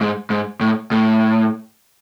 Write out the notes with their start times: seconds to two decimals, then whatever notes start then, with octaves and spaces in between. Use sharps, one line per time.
0.01 G#2
0.30 G#2
0.61 A2
0.91 A2